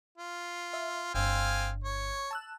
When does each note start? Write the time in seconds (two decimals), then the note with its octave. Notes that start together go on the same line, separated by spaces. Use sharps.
0.18 F4
0.73 E5
1.15 G1 G2 C4 F5 G#5
1.84 C#5
2.31 A5 E6 F#6